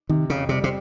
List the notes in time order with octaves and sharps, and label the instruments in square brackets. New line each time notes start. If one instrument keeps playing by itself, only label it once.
[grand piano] C3 [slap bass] D#3
[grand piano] F2 [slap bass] C#3
[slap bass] C3 [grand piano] G3
[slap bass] C3